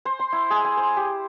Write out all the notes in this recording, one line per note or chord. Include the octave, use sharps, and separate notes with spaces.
C5
C6
E4
G#4
G#5
C5
G4